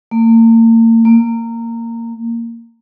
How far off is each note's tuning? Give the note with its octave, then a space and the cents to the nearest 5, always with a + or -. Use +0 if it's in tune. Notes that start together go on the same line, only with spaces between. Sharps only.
A#3 -40
A#3 -15